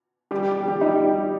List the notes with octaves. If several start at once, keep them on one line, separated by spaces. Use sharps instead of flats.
G3 G4
G4
G4
G3 D#4